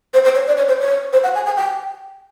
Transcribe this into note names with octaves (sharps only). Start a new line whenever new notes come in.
C5
C5
C#5
D5
C#5
C5
C#5
C5
F#5
G#5
G#5
G5